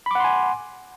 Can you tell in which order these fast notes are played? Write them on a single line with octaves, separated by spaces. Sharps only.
B5 D6 F#5 C6 G#5